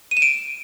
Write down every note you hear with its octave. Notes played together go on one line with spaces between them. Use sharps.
D#7
E7
D7